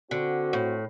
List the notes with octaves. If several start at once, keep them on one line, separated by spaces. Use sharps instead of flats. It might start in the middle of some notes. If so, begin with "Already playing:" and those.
D3 C4 F#4
A2